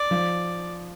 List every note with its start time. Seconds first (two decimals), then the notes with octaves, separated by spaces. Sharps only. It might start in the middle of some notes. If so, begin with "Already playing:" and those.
Already playing: D5
0.11 F3